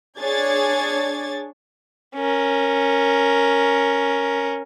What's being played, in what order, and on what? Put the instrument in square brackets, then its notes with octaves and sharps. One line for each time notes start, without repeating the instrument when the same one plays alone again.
[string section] D4 G#4 C#5 G#6 A6
[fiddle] C#4 A#4